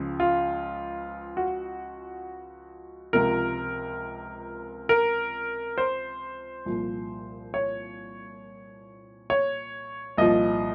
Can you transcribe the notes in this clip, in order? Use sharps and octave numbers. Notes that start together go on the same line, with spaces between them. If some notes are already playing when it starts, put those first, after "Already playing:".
Already playing: C#2 C#3 F3
F4
F#4
C#2 C3 F3 A#4
A#4
C5
C2 A#2 F3
C#5
C#5
C2 A#2 F3 D#5